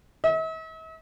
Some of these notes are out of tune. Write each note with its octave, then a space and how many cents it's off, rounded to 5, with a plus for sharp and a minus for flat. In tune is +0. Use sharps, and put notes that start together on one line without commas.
E5 -45